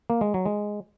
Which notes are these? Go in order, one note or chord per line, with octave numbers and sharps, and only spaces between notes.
A#3
G#3
F#3
G#3